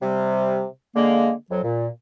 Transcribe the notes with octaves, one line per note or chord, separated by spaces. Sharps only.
C3 G3
D3 G#3 A#3
F2 F#3
A#2